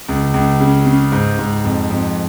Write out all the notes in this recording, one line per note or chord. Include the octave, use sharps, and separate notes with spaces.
C#2
C#2
C#3
C#3
G#2
G#2
F2
F2